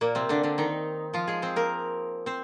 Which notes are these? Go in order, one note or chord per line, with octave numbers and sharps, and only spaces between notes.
A#2 A#3
C3 C4
D3 D4
D3 D4
D#3 D#4
F3 F4
G#3 G#4
C4 C5
A#3 A#4
C4 C5